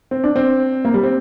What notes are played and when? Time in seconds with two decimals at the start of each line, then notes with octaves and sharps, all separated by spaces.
0.11 C4
0.24 D4
0.36 C4
0.85 A#3
0.94 G3
1.03 C4